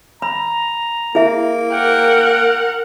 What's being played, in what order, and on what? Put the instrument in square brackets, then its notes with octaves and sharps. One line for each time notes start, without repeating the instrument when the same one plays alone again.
[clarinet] A#5 [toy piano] B5
[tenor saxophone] A#3 [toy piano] E4 G#4 E5
[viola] A#4 F#5 [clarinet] G5